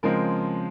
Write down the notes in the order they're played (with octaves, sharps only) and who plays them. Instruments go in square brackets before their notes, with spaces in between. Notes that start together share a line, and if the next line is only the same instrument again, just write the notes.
[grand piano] C#3 F3 G#3 C4 A#4